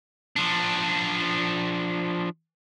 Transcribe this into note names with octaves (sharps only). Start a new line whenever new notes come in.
F3 D4